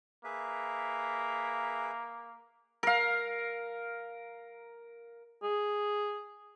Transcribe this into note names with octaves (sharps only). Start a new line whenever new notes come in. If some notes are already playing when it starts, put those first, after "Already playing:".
A#3 G#4 B4 E5
A#4 F5
G#4